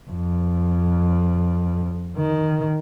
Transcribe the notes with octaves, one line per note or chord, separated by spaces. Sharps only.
F2
D#3